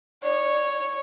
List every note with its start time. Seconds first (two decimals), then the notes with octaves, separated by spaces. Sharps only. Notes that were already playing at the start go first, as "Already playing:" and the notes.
0.23 C#5 D5